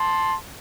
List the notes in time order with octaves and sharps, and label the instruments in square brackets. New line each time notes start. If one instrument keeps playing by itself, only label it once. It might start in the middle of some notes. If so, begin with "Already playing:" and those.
Already playing: [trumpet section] A5 C6